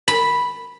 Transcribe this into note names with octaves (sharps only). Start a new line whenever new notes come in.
B5